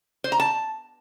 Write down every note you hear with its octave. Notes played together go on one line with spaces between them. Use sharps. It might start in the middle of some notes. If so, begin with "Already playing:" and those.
C5
A#5
A5